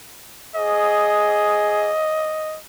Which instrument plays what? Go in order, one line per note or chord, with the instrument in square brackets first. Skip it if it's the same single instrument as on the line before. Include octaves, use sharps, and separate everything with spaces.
[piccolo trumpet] G#4 [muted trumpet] D#5